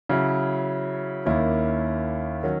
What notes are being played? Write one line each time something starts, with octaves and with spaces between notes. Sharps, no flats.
C#3 F#3 C#4 E4
D#2 D#3 A#3 C#4 E4
D#3 F#3 C#4 F#4